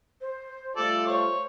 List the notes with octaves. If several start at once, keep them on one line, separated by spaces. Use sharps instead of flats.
C5
G3 A3 F4 A4 D5
C5 C#5